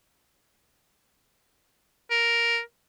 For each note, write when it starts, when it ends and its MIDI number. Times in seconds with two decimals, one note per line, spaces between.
2.11 2.59 70